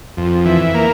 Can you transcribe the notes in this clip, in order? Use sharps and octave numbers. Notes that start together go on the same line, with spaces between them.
F2
E3
A#3